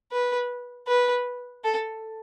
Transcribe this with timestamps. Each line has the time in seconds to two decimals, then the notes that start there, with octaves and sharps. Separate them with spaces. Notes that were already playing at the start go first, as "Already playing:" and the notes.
0.12 B4
0.87 B4
1.64 A4